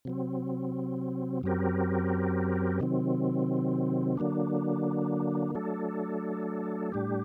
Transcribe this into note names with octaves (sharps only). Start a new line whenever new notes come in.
C3 F#3 C4
F#2 F#3 C4 G4 A#4
C3 D#3 F#3 C4
D3 F#3 A#3 D4
F#3 A3 D4 A4
A2 G3 D4 G4